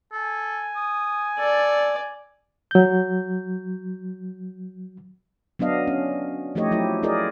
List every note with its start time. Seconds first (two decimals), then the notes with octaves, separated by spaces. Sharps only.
0.13 A4 G#5
0.76 D#6
1.39 A4 D5
2.71 F#3 G6
5.59 F#3 B3 D4 D#5 F5
5.87 C#4
6.55 F3 A3 D#4 G4 C#5 D#5
6.72 F#3 E4 G4
7.03 E4 F4 G#4 A#4 D5 D#5